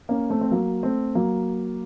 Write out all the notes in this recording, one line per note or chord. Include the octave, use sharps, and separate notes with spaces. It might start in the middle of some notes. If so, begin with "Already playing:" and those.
A#3 C#4
A3 C4
C4
F#3 A#3
A3 C4
F#3 A#3